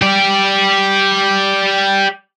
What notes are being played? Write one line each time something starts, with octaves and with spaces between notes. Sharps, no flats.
G4 D5